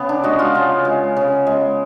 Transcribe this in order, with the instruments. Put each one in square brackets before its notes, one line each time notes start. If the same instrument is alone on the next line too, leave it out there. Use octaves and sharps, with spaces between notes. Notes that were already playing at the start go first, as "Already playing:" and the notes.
Already playing: [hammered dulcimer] C#3 B3
D4
G#3 F#4
F4
C#3
G#3
C#3
G#3